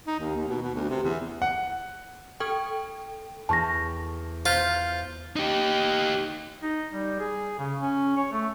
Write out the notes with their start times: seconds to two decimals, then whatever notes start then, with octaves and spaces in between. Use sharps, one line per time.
0.07 D#4
0.20 D#2
0.36 D#2
0.48 B2
0.62 B2
0.75 D2
0.89 C3
1.04 E2
1.42 F#5
2.40 A4 G5 C#6
3.49 E2 A5 C#6 A#6
4.46 F4 C5 F6 G6
5.36 D#4 G4
6.63 D#4
6.93 G3
7.19 G#4
7.59 C#3
7.80 C#4
8.17 C#5
8.32 A3